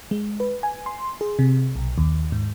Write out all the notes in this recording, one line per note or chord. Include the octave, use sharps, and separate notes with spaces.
G#3
B4
G#5
C6
G#4
C3
B1
D#2
G#2